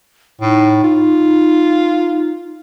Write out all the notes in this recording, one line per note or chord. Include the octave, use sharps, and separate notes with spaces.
A2 D#4
F4